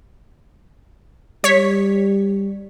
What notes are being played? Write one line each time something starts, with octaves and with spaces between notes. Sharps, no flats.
G3 C#5 B6